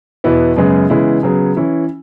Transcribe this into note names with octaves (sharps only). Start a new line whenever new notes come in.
E2 B2 B3 E4
F#2 C#3 G#3 B3 G#4
C#3 E3 G#3 B3 E4
C#3 F#3 B3 G#4
E3 C#4 E4